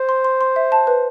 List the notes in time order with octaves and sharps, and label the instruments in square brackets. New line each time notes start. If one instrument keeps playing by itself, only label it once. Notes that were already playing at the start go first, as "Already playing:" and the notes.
Already playing: [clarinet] C5
[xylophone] C6
C6
C6
E5
A5
B4